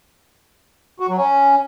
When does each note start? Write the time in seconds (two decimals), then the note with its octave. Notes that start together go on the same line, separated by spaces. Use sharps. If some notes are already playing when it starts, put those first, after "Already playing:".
1.00 F#4
1.09 F#3
1.17 C#4